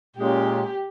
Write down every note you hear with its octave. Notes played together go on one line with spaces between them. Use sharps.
A#2 G#3 C#4 G4